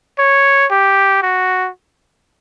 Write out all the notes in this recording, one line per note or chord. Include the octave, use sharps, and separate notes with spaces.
C#5
G4
F#4